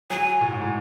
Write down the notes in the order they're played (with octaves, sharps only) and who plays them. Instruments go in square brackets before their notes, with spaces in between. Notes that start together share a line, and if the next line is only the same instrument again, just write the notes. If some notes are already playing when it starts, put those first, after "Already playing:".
[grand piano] F#3 [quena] G#5
[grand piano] A2
G#2
A2